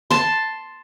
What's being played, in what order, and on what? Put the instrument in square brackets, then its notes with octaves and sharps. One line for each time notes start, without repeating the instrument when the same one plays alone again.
[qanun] A5 C6